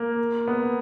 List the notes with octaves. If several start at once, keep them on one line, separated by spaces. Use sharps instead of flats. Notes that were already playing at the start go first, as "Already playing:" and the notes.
Already playing: A#3
B3